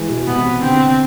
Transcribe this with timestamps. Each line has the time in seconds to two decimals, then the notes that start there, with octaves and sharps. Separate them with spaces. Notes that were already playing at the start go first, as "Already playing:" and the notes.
Already playing: E3 G#3
0.09 B2
0.27 C3 B3
0.62 D3 C4